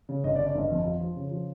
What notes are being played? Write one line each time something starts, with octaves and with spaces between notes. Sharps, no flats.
C#3
G1 D#5
D5
C#3
D5
G1 D#5
F2
F3
F3
C#3
F3